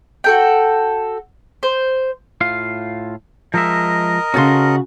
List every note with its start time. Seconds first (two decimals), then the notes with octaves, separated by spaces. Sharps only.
0.24 F#4 A4 G5
1.63 C5
2.41 A2 F4 F5
3.54 F3 G#3 A#4 D#5 E5
4.34 C#3 C#4 F#4 A4 C6